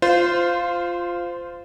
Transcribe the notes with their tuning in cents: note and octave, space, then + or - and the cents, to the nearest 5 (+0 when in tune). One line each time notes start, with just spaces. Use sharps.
F4 +0 C5 -15